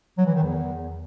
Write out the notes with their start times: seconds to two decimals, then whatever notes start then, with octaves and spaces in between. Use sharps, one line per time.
0.18 F#3
0.26 E3
0.35 D#3
0.43 E2